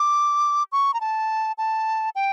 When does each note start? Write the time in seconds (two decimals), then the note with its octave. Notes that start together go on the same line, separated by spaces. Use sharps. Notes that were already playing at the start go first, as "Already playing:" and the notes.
Already playing: D6
0.72 C#6
0.94 A#5
1.01 A5
1.58 A5
2.15 G5